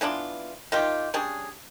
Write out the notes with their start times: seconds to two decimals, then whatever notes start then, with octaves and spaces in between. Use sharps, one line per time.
0.01 E3 B3 D4 F4
0.72 D#3 F4 G4
1.14 G3 C#4 D4 G#4